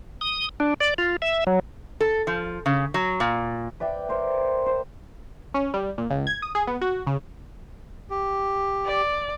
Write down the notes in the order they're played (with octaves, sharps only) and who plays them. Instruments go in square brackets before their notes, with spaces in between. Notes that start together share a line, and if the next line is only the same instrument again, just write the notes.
[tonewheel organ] D#6
D4
D5
F4
E5
F#3
[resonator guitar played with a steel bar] A4
F3
C#3
F#3
A#2
[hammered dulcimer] B4 D5 E5 G5
A#4 C5 G5
C5
[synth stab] C#4
G3
A#2
C#2
G#6
D#6
G#4
B3
F#4
C#3
[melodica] G4
[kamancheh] D5